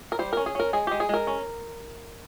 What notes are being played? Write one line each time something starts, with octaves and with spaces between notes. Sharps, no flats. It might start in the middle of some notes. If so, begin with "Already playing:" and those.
A#4
G3 C5
C#4 A#4
G#4
C#4 A#4
G#3 G#4
G#3 G4
G#4
G#3 A#4
C#4